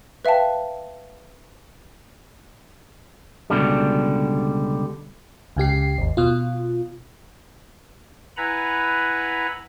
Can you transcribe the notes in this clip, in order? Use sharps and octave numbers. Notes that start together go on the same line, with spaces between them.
B4 E5 F5 G5 A5
C#2 F#2 B2 D3 G3
C#2 C#3 G4 C7
G#1 D#2
B2 F4
E4 B4 F#5 G#5 A#5 B5